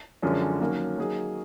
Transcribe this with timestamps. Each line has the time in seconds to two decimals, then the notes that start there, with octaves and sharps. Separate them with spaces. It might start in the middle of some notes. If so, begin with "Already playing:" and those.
0.22 F#2 D3 F3 G#3 C#4
0.60 D#3 F#3 A#3 C#4 F#4
0.98 F#3 A#3 D#4 G#4